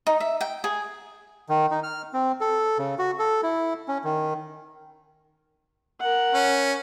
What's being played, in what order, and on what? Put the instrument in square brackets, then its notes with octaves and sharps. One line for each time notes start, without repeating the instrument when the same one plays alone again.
[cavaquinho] D#4
E5
G5
G#4
[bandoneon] D#3
D#4
F6
C4
A4
C#3
F#4
A4
E4
C#4
D#3
[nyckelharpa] A#4 F#5
[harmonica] C#4